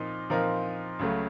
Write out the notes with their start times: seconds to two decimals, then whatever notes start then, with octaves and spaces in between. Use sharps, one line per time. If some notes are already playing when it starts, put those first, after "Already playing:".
Already playing: A#2 F3 C4 D#4 A#4
0.30 A#2 F3 C4 D#4 A#4
0.99 C#2 C#3 F#3 A3